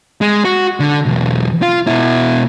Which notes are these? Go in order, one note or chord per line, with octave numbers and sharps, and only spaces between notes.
G#3
F#4
D3
B1 E2
F4
B2 E4